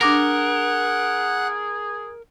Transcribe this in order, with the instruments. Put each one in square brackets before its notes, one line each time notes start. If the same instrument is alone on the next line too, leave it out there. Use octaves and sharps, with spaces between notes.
[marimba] D4 D6 A#6 [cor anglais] G#4 [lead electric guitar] A#4 [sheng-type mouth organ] F#5